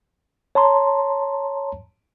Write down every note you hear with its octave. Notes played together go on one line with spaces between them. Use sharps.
C#5 A5 A#5 C6